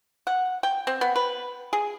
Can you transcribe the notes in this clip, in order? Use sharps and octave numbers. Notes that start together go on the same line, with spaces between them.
F#5
G5
C4
B3
B4
G#4